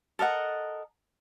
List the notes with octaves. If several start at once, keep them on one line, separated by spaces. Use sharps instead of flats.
A4 A#4 D#5 F#5